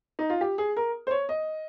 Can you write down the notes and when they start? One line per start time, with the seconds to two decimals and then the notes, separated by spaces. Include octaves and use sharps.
0.19 D#4
0.30 F4
0.41 G4
0.58 G#4
0.77 A#4
1.07 C5
1.11 C#5
1.29 D#5